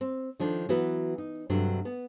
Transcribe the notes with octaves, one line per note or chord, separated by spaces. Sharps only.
C4
D#3 F3 D4 A4
E3 F#3 B3 F#4 B4
D#4
G2 C3 F#3 A3 D4
B3